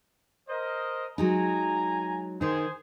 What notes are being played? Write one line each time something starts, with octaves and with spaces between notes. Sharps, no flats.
A#4 C5 D#5
F#3 G#3 D#4 G#5 A#5
D#3 D#4 G#4 C5